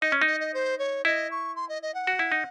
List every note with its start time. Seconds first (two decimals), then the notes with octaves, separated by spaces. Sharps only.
0.02 D#4 D#5
0.12 C#4
0.22 D#4
0.27 D#5
0.40 D#5
0.54 C5
0.79 C#5
1.05 E4 D#5
1.31 C#6
1.56 C6
1.69 D#5
1.82 D#5
1.94 F#5
2.07 F#4
2.19 E4
2.32 D#4